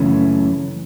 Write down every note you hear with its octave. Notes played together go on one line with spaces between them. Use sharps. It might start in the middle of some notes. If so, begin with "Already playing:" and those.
Already playing: F#2 C#3 E3 A3 C#4